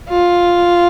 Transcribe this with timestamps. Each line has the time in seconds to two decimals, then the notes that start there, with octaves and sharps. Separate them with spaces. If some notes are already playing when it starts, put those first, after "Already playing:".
0.09 F4